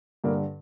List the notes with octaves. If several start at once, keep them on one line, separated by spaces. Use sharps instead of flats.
G2 D3 A#3